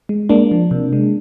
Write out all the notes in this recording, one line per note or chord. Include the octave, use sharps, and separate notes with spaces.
G#3
G#3 A#3 D4
F3
C3
G#3